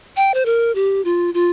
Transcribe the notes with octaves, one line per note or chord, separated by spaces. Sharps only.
G5
C5
A#4
G4
F4
F4